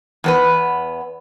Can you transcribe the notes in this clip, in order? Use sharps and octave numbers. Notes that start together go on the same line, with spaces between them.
E2 B3 B4